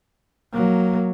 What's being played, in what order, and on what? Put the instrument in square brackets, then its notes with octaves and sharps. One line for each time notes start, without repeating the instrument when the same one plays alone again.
[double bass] F#3 A#3